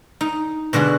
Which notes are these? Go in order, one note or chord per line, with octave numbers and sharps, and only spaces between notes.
D#4
B2 D3 G#3 F#4